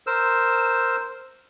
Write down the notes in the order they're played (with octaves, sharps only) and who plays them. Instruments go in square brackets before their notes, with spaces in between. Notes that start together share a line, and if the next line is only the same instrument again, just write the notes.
[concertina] A#4 C5 E6